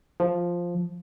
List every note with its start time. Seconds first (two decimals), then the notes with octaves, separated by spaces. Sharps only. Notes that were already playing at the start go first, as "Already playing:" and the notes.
0.20 F3